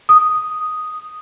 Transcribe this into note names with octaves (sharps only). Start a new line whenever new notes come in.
D#6